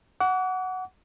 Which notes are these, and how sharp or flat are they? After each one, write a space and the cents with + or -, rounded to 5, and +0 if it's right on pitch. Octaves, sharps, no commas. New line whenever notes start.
F#5 +0 D6 -45